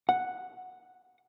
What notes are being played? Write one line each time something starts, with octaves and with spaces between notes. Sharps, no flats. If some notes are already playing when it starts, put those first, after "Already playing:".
F#5